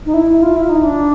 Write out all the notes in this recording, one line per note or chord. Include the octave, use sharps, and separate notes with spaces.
D#4
E4
F4
E4
D#4
D4